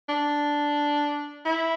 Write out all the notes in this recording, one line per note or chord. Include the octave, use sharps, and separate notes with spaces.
D4
E4